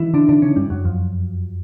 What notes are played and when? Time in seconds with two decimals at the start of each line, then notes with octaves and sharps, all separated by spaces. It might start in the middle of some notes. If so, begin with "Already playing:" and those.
Already playing: D#3 E3 D#4 E4
0.14 D3 D4
0.29 D3 D4
0.42 C#3 C#4
0.56 G2 G3
0.70 F#2 F#3
0.85 F2 F3